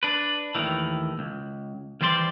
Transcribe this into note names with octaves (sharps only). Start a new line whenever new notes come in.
D4 B4
D#2 A2 D#3 E3
C#2
D#2 E3 G3 C5 D5 C6